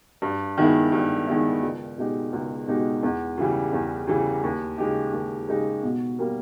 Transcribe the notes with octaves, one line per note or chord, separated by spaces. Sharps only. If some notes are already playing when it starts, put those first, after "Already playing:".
G2
D#3 G#3 B3 E4
G2
D#3 G#3 B3 E4
C#2
B2 G#3 D#4 G4
C#2
B2 G#3 D#4 G4
E2
C#3 E3 G3
E2
C#3 E3 G3
D#2
C#3 G#3 D#4 G4
D#2
C#3 G#3 D#4 G4
B2
G3 A#3